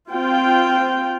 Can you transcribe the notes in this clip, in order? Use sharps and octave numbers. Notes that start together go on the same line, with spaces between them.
C4 F4 G5